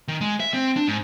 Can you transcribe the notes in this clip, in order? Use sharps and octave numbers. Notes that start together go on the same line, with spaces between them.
D#3
G#3
E5
C4
D4
G#2